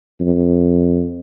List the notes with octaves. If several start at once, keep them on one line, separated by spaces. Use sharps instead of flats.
F2